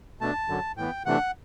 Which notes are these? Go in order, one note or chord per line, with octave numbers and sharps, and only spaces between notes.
B2 A3 D4 A5
F#2 D3 F#3
A2 E3 B3 G5
C3 E3 A3 D4 F#5